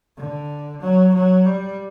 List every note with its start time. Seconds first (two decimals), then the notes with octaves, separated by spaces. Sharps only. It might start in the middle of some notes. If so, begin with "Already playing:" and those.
0.17 D3
0.81 F#3
1.14 F#3
1.45 G3